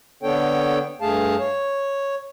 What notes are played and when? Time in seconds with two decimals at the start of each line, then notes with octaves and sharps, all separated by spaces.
0.23 D3 B3 D4 A4 C#5 G5
1.01 G2 A3 G#4 F5 A5
1.40 C#5